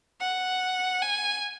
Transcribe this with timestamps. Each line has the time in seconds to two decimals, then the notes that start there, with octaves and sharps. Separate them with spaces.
0.20 F#5
1.02 G#5